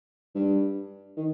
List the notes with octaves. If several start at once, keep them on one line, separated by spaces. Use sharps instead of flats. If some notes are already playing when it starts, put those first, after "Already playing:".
G2
D#3